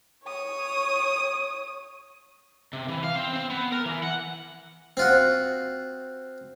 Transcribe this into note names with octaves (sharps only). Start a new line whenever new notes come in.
C#5 D#6
C3
E3
F5
C4
C4
B3
A#4
E3
F#5
C4 F4 F#4